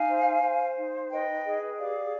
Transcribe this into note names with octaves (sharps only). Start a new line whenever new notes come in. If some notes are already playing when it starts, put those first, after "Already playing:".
Already playing: D#4 F5 G#5
C5
C5
D#4
B4 D#5 G5
G#4
G4 D5 F5